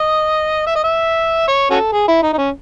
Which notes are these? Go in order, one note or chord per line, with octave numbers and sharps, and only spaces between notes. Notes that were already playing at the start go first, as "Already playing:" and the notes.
Already playing: D#5
E5
D#5
E5
C#5
C#4 F#4 A4
G#4
E4
D#4
D#4
C#4